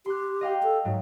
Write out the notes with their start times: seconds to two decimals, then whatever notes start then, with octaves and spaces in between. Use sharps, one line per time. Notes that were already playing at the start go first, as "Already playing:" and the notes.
0.06 G4 C6 F#6
0.41 D#5 F5 G5
0.63 A4
0.85 G#2 F#3